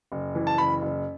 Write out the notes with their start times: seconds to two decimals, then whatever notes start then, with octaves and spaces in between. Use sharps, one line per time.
0.12 F#1
0.35 E3
0.47 A5
0.58 F#1 B5
0.82 F#1